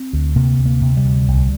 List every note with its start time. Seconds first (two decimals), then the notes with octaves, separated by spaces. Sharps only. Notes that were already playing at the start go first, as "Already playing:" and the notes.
Already playing: C4
0.13 D2
0.36 C3 A#3
0.59 D2
0.66 A#3
0.81 C3
0.97 G3
1.04 D2
1.28 C2